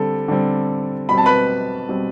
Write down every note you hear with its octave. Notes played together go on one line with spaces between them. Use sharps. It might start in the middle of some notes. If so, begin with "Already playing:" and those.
Already playing: D3 G3 C4 A4
D3 G3 C4
B2 G3 C4 B5
A5
B4 B5
B2 G3 C4